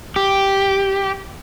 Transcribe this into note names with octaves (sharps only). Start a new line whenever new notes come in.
G4